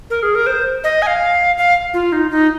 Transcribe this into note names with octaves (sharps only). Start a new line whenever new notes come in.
A#4
G#4
A#4
C5
D#5
G#5
F5
F5
F4
D#4
D#4